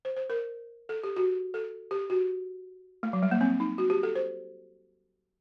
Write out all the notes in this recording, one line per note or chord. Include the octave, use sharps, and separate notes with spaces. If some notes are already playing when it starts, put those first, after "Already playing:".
C5
C5
A#4
A4
G4
F#4
A4
G4
F#4
A3
F#3
G3
A#3
C4
D#4
F#4
G4
A4
C5